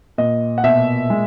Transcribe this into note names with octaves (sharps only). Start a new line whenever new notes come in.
A#2 D#5
F#5
B2 E5
G#3